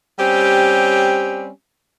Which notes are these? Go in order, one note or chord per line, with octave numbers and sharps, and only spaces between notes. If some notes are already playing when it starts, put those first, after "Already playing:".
G3 C4 C#4 G4